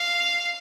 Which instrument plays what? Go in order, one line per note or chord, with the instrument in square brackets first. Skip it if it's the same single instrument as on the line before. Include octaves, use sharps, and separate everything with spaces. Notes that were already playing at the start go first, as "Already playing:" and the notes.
Already playing: [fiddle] F5